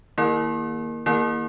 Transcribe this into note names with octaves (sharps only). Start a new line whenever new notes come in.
D#3 A#3 E4 A#4
D#3 A#3 E4 A#4